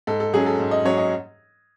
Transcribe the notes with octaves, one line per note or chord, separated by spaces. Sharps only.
G#2 A4
A4
F#3 C#4 G#4
A4
G#2
D#5
F#3 C#4 C#5
D#5